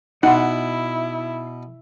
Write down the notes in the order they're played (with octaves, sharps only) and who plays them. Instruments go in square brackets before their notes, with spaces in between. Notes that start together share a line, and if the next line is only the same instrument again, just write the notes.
[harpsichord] B2 [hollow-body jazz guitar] D#4 C6 [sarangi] E4 [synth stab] F#5